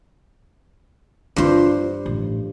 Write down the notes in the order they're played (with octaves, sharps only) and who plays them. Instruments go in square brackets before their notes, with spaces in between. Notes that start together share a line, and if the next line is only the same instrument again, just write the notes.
[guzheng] G2 C5 [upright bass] E4 F4
[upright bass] A1